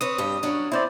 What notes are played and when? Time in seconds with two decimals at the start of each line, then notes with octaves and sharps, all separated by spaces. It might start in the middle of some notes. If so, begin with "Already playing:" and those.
0.01 C4 B4 C#5 D#6
0.18 G2 G4
0.43 F#3 C#4 D4
0.72 C4 C#4 E4 C5 D5